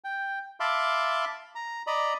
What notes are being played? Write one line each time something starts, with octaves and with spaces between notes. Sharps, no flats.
G5
E5 F5 A5 B5 C6 D6
A#5
D5 D#5 A#5 B5